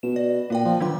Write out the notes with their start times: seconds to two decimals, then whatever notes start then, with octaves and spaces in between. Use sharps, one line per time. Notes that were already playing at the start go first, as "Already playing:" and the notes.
0.03 B2 E7
0.16 D5
0.50 A#2 A#3 D5 G5
0.65 F3
0.80 D3 D#3 F#3 C6